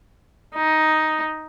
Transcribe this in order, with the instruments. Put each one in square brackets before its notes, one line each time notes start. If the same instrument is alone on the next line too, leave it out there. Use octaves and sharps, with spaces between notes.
[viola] D#4